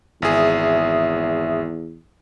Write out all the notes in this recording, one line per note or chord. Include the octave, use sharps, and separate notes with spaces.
G#1 E2 G#4 E5